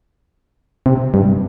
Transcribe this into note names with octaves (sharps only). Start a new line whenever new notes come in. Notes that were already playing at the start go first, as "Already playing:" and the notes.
C3
G2